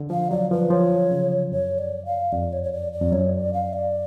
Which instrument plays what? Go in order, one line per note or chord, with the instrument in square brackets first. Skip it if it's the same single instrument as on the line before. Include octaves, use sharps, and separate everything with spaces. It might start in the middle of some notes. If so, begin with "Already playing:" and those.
Already playing: [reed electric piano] D3
[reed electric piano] F3 [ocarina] F5
[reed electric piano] F#3 [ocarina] D5
[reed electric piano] F3 [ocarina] B4
[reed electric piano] F3 [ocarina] C#5
[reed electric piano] C#3
[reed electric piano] F#2 [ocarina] C#5
[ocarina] D5
F5
[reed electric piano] F2 [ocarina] D5
[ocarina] C#5
C#5
D5
D5
[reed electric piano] F2
[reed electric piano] F#2 [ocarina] C#5
[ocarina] D5
F5
D5